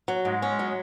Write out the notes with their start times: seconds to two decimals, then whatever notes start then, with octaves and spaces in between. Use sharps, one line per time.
0.08 F#3
0.25 G#2 G#3
0.42 C#4
0.59 F#3